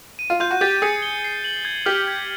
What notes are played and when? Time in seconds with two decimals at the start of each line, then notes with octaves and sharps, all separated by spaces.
0.19 D#7
0.30 F4
0.40 F4 G6
0.51 F#4
0.61 G4 A6
0.82 G#4 C#7
1.02 G7
1.24 C7
1.44 F#7
1.65 G#6
1.86 G4 F6
2.08 G#6